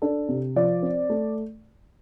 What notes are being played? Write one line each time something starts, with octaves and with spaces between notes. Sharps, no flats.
D4 A4
C3
F3 D5
C4
A3